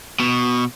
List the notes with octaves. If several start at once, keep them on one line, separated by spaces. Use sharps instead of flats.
B2